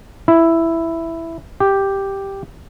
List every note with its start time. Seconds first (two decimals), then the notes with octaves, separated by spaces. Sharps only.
0.28 E4
1.60 G4